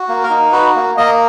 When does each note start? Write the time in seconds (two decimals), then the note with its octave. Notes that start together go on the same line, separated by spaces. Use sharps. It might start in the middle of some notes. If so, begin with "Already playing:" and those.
Already playing: F#4
0.09 A#3
0.23 A#4
0.30 D#4
0.52 F#4 B4
0.75 A#3
0.97 A#3 D#5